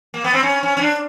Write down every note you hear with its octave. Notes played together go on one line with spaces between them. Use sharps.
A#3
B3
C4
C#4
C#4
C#4
D4